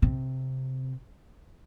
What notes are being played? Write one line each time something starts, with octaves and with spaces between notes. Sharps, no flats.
C3